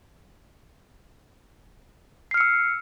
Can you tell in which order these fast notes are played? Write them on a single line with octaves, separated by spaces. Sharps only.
C7 F6 C#7 E6